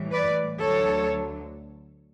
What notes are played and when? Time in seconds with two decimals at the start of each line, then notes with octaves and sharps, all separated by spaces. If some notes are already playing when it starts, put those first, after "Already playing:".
Already playing: A2 E3 G3
0.11 B4 D5
0.60 D2 D3 F#3 A4 C#5